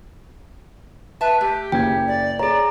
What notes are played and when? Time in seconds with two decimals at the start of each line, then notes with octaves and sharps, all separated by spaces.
1.21 B4 E5 A5
1.41 A3 G4
1.72 F#1 C#3 G5 G#6
2.08 D5
2.39 G#4 C#5 D5 A#5